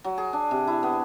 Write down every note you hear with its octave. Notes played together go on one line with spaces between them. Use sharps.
F#3
G#4
D4
C3
E4
B3